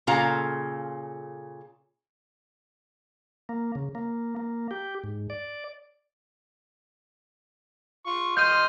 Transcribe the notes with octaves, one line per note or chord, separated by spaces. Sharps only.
A#2 C#3 F4 A4 F5 A#5
A#3
C#3
A#3
A#3
G4
G#2
D5
F4 C#6
D#5 C6 F6 G6 D#7